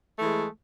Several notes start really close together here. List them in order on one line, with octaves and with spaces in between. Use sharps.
A3 E3 G#3